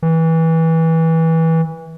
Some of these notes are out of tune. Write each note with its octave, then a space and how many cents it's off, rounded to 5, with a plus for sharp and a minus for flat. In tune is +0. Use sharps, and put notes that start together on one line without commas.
E3 -20